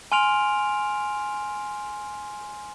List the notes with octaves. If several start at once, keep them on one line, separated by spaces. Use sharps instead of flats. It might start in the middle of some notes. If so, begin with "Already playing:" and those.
G#5 C6 F6 D7 F7